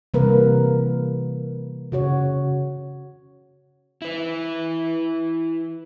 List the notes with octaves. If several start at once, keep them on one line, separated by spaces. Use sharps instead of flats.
C3 E3 G3 A#3 A#4 B4
C#3 F#4 C#5
E4 B4